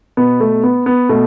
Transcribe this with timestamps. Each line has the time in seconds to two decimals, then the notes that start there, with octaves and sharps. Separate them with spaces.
0.17 B2 B3
0.40 A3
0.63 B3
0.86 B3
1.09 B2 A3